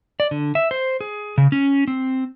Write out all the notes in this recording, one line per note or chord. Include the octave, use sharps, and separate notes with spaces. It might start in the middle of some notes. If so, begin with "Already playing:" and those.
D5
D3
E5
C5
G#4
C#3
C#4
C4